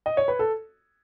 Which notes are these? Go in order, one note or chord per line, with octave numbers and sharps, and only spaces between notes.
D#5
C#5
B4
A4